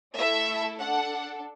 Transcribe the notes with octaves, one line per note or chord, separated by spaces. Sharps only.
A3 E4 A4 E5
D4 A4 F#5